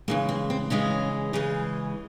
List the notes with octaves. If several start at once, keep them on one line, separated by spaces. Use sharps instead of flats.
C#3 E3 G#3 A#3
C4
C4
C#3 E3 G#3 C#4
C#3 E3 G#3